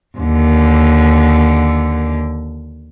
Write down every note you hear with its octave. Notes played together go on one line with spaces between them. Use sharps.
D#2 D3